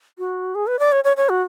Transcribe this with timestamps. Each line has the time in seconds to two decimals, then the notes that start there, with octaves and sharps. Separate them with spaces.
0.19 F#4
0.55 G#4
0.67 B4
0.79 D5
0.92 C#5
1.04 C#5
1.17 C#5
1.29 F#4